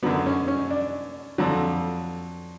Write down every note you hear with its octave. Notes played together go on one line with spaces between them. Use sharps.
F#2 D3 F#3 B3
C#4
C#4
D4
F2 D3 F#3